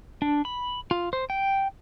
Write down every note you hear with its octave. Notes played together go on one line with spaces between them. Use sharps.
D4
B5
F4
C5
G5